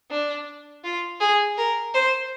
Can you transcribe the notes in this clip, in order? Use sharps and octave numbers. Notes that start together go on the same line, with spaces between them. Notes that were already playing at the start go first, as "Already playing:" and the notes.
D4
F4
G#4
A#4
C5